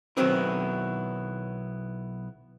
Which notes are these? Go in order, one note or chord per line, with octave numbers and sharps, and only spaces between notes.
B1 D#3 F#3 B3 C4 E4